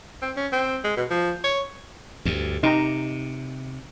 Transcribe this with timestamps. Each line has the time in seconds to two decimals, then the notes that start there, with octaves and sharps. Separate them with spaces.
0.22 C4
0.37 C#4
0.52 C4
0.84 G#3
0.97 B2
1.11 F3
1.44 C#5
2.25 D2 G2
2.63 C3 D#4 G4 A#5